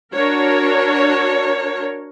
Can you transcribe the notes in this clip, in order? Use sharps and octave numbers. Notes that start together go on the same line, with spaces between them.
D4 F#4 A#4 C#5